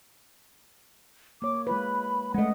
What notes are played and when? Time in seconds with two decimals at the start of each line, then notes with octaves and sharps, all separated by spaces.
1.42 A#3 C#5 D6
1.67 G#3 F4 B4 B5
2.34 G#3 A3 C#4 D#5 F#5